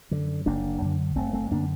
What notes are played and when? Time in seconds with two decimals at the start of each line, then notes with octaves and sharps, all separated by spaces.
0.11 F#2 D3
0.46 F#1 A#3 D4
0.82 F#2 D3
1.15 F#1 A3 C4
1.33 A3 C4
1.51 F#2 D3 A#3 D4